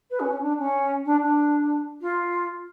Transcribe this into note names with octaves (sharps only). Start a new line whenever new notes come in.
B4
C#4
C#4
D4
C#4
D4
D4
F4